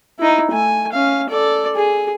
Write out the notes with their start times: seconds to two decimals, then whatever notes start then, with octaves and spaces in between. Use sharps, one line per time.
0.19 D#4 E4
0.51 A3 G#5
0.92 C#4 F5
1.30 A4 D5
1.76 G#4